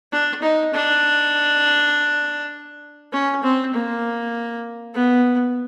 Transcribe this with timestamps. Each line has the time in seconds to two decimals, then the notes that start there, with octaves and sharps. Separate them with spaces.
0.12 D4
0.42 D#4
0.73 D4
3.13 C#4
3.43 C4
3.73 A#3
4.94 B3